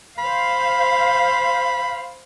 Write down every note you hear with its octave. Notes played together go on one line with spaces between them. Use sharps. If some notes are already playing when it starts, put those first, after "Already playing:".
C5 F5 B5